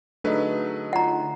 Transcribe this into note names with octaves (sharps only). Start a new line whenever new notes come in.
D3 F#3 A3 D#4 G#4 B4
F4 F#5 A#5